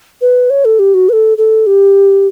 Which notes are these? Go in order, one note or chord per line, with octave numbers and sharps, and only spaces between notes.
B4
C#5
A4
G4
F#4
B4
A4
A4
G4